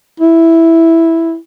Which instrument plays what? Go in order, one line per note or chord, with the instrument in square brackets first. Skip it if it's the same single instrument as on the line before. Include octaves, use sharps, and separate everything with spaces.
[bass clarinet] E4